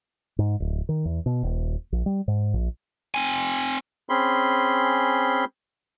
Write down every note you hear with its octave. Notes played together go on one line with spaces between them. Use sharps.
G#2
D1
D#3
E2
B2
D#1
A#1
G3
G#2
A#1
C4 G#5
C4 C#4 G#4 B5 C6